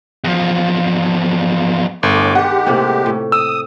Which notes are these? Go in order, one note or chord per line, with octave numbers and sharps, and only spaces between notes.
E2 F3
G1 A2 G#3 D6
D#3 G#3 G4 F#5
A2 C3 A#3
A2
D#6 E6